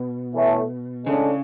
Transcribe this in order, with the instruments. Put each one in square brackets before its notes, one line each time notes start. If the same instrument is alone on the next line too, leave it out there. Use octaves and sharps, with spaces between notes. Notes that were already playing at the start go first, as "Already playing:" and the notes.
Already playing: [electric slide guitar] B2
[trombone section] A2 E3 A3
[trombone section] A2 G#3 D4 A4 [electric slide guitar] C#3